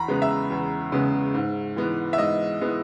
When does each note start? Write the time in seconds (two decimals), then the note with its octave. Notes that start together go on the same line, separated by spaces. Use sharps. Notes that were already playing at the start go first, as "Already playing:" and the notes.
Already playing: E2 A#5 B5
0.08 C#3 G#3 B3
0.22 E5
0.50 E2
0.92 C#3 G#3 B3
1.34 G#2
1.76 E3 G#3 B3
2.13 E5
2.18 G#2 D#5
2.61 E3 G#3 B3